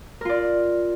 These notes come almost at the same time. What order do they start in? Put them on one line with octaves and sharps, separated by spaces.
A#4 F4 D5